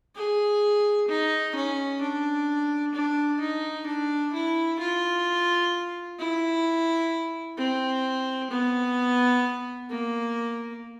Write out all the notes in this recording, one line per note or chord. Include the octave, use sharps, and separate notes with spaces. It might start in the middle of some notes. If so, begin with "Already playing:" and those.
G#4
D#4
C#4
D4
D4
D#4
D4
E4
F4
E4
C4
B3
A#3